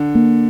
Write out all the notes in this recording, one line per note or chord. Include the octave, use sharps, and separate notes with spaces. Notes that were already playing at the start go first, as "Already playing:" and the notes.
Already playing: D3
A#3